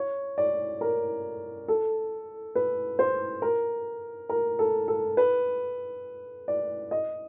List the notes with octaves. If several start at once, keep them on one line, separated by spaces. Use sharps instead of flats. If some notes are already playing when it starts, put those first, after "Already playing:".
Already playing: C#5
D5
A#4
A4
B4
C5
A#4
A#4
A4
A4
B4
D5
D#5